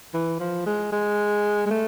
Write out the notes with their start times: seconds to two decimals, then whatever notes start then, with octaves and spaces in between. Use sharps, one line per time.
0.14 E3
0.40 F3
0.66 G#3
0.92 G#3
1.66 G#3
1.71 A3